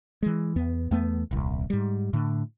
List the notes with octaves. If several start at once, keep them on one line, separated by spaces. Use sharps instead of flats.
E3 G#3
E2 B3
E2 A3 B3
D#1 C2
G#2 G3
A2 D3